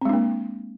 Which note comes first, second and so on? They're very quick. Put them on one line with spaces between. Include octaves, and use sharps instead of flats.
C4 G#3 D4 A#3